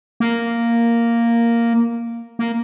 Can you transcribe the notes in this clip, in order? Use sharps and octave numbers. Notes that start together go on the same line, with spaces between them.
A#3
A#3